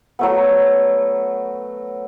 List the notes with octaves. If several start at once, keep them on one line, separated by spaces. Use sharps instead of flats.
F#3 A3 B3